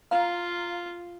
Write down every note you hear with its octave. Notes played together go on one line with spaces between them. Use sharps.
F4 F5 A#5